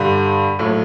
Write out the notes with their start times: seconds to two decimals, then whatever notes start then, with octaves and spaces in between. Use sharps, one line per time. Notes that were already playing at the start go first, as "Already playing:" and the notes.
Already playing: G2 D3 G3
0.59 A#1 A2 F#3 A3